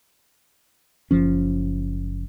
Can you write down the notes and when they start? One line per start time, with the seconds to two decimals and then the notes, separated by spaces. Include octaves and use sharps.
1.11 F#1 F3 C#4